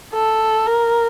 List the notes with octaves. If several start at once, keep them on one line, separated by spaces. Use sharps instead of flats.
A4
A#4